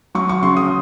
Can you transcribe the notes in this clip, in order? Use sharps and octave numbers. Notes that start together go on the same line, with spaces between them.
F#3 C#6
C#6
C#3 C6
D#6